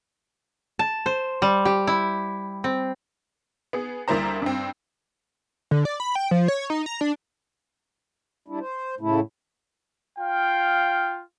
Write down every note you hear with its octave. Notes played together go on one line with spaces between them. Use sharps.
A5
C5
G3
G4
E4
C4
B3 G#4
D2 G3 A#3 E4 C5 A#5
G2 C4
D3
D5
B5
G5
F3
C#5
D#4
A#5
D4
G3 D4 E4
C5
A2 C#3 A3 E4
F4 F5 G5